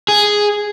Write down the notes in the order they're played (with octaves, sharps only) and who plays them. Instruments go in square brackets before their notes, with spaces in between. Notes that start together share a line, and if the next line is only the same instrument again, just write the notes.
[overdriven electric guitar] G#4